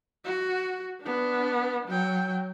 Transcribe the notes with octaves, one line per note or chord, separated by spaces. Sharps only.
F#4
B3 D4
F#3 G5